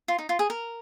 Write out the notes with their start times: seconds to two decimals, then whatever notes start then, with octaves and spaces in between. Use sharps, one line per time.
0.08 F4
0.19 D#4
0.29 F4
0.39 G#4
0.50 A#4